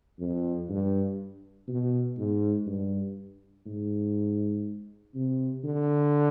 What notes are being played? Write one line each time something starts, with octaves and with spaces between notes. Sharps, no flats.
F2
G2
B2
G#2
G2
G#2
C3
D3